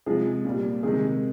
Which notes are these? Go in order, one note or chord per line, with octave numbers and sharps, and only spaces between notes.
C3 F3 G#3 G#4
A#2 G3
C3 D#3 G#3 G#4